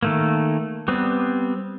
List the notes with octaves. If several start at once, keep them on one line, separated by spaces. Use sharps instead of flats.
D#3 A3 A#3
G3 B3 C4